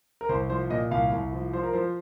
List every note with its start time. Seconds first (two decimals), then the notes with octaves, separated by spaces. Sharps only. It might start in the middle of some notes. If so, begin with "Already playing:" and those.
0.21 A#4
0.29 C2 C5
0.50 F3 C5
0.70 A#2 D#5
0.91 C2 F5
1.12 C2
1.33 F3
1.53 F3 C5
1.63 A#4
1.73 F3 C5